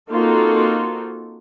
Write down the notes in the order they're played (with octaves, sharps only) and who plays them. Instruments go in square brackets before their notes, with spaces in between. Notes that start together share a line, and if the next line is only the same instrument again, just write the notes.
[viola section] A#3 C4 D#4 F4 F#4 A4